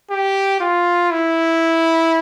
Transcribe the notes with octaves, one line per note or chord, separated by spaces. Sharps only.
G4
F4
E4